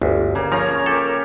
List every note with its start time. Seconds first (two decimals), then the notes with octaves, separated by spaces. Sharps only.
0.02 G1 D2
0.35 C#3 A#3
0.52 F3 C#4 C#5 A#5
0.86 G4 A4 A#4